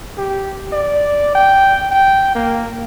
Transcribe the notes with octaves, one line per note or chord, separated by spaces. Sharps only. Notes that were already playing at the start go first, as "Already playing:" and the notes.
G4
D5
G5
G5
A#3